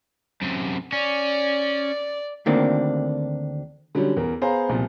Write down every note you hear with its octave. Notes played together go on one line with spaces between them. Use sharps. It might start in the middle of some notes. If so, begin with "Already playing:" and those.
F#2 C3
C#4 D5
D2 D#3 A#3 C4 D4
D3 F#3 G3 C#4
E2 A#4
B3 G#4 C5 F5 A#5
C2 A#2 F3